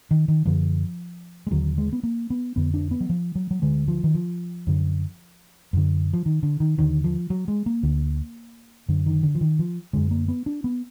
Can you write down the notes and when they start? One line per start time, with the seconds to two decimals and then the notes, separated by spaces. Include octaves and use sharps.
0.11 D#3
0.28 D#3
0.45 F#2 D3 F3
1.47 G#3
1.51 D#2 D3 F#3
1.78 G#3
1.93 B3
2.03 A#3
2.30 B3
2.56 F2 D3 B3
2.74 D4
2.91 B3
3.01 F#3
3.10 F3
3.35 F#3
3.51 F#3
3.62 D2 D3 G#3
3.88 F3
4.04 D#3
4.15 F3
4.67 F#2 D3
5.73 F#2 D3
6.13 F3
6.26 D#3
6.43 D3
6.60 D#3
6.78 D#2 D3 D#3
7.04 F3
7.30 F#3
7.48 G#3
7.66 A#3
7.83 D2 D3
8.89 F#2 D3
9.06 D#3
9.23 D3
9.35 F3
9.41 D#3
9.59 F3
9.93 F#2 D3 G#3
10.11 A#3
10.28 B3
10.46 D4
10.64 B3